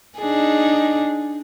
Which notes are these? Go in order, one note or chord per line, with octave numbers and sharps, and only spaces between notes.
D4 D#4 G#4